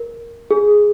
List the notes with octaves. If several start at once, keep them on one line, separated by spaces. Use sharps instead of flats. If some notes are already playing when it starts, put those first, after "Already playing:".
Already playing: A#4
G#4